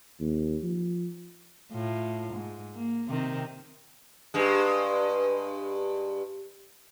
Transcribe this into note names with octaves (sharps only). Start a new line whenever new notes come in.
D#2
F3
A2 F4
G#2
A#3
C3 D#3 C4
G2 G#3